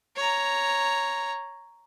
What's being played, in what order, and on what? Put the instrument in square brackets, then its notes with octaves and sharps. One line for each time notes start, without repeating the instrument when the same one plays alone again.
[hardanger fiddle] C#5 A#5